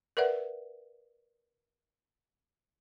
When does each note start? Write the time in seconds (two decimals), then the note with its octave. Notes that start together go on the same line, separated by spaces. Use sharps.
0.17 A#4 B4 D5 E5 F#5